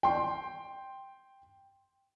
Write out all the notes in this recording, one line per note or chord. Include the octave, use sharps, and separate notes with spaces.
G5 C6